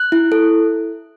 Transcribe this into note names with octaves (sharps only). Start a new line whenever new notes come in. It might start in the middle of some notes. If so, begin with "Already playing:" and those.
Already playing: F#6
E4
A4